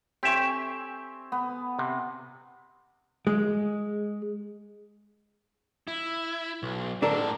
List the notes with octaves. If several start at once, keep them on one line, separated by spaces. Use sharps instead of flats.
C4 G4 E5 G#5 C#6
B3
C3
G#3
E4
B1
A2 D3 D4 A4 A#4